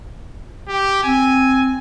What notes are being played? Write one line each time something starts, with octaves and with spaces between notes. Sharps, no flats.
G4
C4 G#5